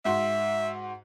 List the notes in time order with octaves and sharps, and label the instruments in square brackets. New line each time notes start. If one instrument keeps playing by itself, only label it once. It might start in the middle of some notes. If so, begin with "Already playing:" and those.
[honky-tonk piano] G#2 F#4 C6 [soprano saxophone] E5